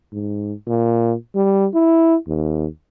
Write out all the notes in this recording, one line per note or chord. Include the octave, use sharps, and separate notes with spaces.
G#2
A#2
G3
E4
D#2